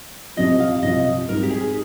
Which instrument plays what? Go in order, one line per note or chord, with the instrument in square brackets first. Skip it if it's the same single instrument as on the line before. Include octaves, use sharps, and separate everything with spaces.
[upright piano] C2 C3 F3 [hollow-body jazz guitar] D#5
[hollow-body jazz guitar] F5
[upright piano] C2 C3 F3 [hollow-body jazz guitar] D#5
[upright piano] G#2 G3 C4 D#4 [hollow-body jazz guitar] A#4
[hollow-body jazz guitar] G4
G#4